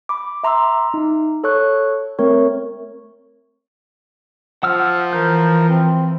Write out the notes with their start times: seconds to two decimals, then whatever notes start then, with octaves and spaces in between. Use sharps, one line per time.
0.09 B5 D6
0.44 E5 A#5 C6 D6 E6
0.94 D#4
1.44 A4 C#5 C#6 F#6
2.19 A3 C4 A#4 C#5 C#6
4.63 F3 F#5 E6 F6
5.13 E3 A#4 G6
5.69 C4